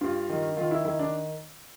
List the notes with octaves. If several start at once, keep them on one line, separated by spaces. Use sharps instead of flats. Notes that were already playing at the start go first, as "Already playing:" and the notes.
G2 F4
D#3
D#3 F4
E4
D#3 E4
D4